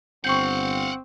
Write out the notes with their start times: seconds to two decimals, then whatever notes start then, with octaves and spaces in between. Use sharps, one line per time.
0.25 G1 C4 F5 F#5 C#6 G6